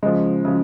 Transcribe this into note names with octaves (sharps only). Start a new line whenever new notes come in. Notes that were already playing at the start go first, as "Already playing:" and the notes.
C#3 F3 G#3
C#3 F3